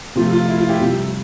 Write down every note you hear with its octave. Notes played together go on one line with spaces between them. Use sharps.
C3 F3 A3 F4
F4
E4
F4
E4 G4
C3 G3